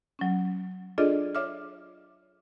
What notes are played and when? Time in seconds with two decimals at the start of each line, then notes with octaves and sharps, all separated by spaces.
0.19 F#3 C#4
0.98 D4 F4 G#4 A4 D5 D#5
1.35 C#5 E5 D6 F6